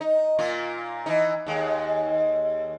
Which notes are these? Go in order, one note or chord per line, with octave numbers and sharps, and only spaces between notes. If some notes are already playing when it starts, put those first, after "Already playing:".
D#4
A#2 A#3 F4
E3 D#4
D#2 G#3